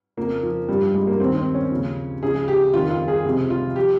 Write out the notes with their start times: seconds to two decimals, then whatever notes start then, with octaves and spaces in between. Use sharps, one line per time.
0.17 F2 C#3 F3 A#3
0.43 F3
0.68 G2 F3 G3
0.82 G3
0.94 G#3
1.07 A#3
1.20 D#2 D#3 C4
1.37 C4
1.54 C#4
1.71 D#2 C#3 F3
2.23 C#2 C#3 F3 G#4
2.48 G4
2.73 F2 D#3 F4
2.91 F4
3.08 G#4
3.25 C#2 C3 F3
3.50 F4
3.76 F3 G4